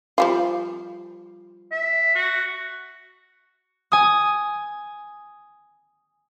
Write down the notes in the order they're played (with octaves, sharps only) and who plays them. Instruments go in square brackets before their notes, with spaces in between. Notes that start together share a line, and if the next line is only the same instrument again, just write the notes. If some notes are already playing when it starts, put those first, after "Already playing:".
[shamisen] F3 G3 F4
[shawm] E5
F#4
[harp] G#5 D#6